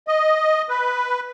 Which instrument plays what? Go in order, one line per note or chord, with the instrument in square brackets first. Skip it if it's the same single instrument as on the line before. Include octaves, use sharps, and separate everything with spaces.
[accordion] D#5
B4